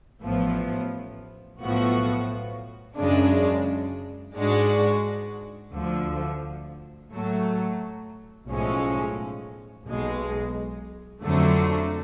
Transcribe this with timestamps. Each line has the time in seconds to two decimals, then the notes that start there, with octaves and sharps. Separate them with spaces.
0.22 A1 A2 F3 B3
1.60 B1 A2 F3 B3 F#4
2.97 F#2 C#3 G#3 D4
4.35 G#2 G#3 D4 F#4
5.72 D2 D3 F3
7.10 A2 F#3 A3
8.48 B1 A2 F3 G#3 C#4
9.85 B1 B2 G#3
11.22 F2 D3 F#3 A3